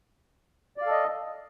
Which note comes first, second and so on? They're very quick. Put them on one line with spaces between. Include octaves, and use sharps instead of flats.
D5 F5 A4 D#5